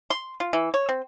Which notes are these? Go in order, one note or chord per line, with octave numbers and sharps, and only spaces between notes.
C6
F4
E3
C#5
C4